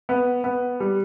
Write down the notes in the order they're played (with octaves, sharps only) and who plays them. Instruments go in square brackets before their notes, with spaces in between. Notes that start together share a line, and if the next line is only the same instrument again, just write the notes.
[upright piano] B3
B3
G3